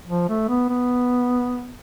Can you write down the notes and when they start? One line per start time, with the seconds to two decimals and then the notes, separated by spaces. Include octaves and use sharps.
0.07 F3
0.29 A3
0.48 B3
0.69 B3